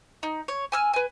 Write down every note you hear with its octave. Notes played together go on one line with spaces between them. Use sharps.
D#4
C#5
G#5 E6 F6
B4 G#5